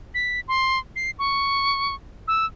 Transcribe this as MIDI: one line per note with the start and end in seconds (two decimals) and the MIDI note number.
0.15 0.40 95
0.48 0.79 84
0.96 1.11 96
1.19 1.95 85
2.28 2.46 88